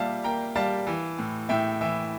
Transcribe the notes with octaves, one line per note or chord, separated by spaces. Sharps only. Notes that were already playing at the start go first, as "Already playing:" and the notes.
Already playing: A#2 G3 E5 F5 A5
A#3 G5 A#5
G3 F5 A5
E3
A2
A2 E5 G5
E3 E5